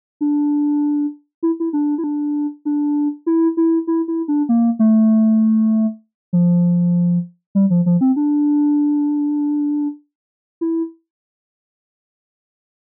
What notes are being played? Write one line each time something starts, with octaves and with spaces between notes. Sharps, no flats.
D4
E4
E4
D4
E4
D4
D4
E4
E4
E4
E4
D4
A#3
A3
F3
G3
F3
F3
C4
D4
E4